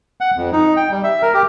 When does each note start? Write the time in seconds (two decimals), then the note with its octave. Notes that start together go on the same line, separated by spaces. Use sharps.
0.21 F#5
0.36 F2
0.52 D#4
0.77 G5
0.91 G3
1.04 E5
1.22 A#4
1.34 G4